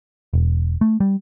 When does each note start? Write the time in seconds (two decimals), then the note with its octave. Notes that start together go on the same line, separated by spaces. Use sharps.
0.33 E1
0.81 A3
1.00 G3